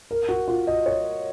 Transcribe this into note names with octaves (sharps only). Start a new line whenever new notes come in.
A#4
F#4
F4
D#5
C#5